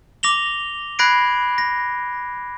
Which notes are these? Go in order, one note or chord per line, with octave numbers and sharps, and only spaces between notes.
D6 A#6 F7 G7
B5 F#6 G#6 A#6 C7 D7
A#6